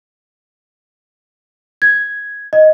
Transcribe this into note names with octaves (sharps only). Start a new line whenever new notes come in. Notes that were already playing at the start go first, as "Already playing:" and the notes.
G#6
D#5